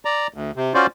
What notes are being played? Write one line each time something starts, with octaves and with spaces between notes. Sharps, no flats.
D5 A#5
D2
C3
C#4 F4 F#4 C5 D5